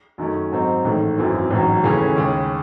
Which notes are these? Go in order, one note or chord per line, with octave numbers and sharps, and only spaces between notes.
F#2 D#3 A3 C#4
G#2 F#3 C4 D#4
A1 G#2 D#3 A3
G#1 F#2 E3 C4
A1 G#2 F#3
D#2 C#3 E3 A3 C#4
D#2 C#3 G#3